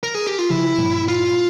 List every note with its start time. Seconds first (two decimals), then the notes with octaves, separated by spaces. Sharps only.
0.03 A#4
0.15 G#4
0.27 G4
0.39 F4
0.50 C#3 F3 E4
0.78 G2 A#2
1.08 F4